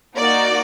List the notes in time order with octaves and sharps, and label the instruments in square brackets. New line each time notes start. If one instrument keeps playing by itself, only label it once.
[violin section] A#3 D#4 F#4 D5